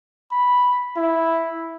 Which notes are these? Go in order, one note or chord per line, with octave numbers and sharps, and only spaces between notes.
B5
E4